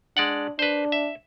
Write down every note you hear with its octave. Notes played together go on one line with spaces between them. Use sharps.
G#3 D4 D5 F#5
D4 B4 C5
E5